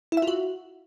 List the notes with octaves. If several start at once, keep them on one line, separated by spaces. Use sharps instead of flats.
E4
E5
F4
F#4